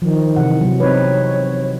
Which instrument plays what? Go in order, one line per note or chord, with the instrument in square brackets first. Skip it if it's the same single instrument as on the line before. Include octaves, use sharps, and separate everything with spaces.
[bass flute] D#3 [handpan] F3
[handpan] C3 E3 F#5
C3 F#3
[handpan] C4 D#4 B4 [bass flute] C#5